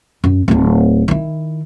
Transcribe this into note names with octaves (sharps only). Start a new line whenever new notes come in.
F#2
D1 D#4
D#3 E4